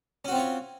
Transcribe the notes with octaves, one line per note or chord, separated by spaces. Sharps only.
C4 C#4 F4 F#4 C#5